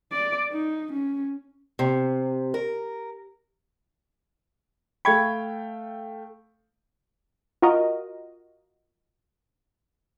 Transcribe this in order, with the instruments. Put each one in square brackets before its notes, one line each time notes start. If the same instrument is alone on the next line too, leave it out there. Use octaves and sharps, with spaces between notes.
[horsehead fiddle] D5
D#4
C#4
[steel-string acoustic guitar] C3
A#4
[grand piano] A3 F5 G5 [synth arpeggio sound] B5 C#6 G#6
[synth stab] F4 F#4 A#4 D#5